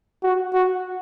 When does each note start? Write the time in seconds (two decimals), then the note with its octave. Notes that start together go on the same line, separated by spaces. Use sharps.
0.23 F#4
0.54 F#4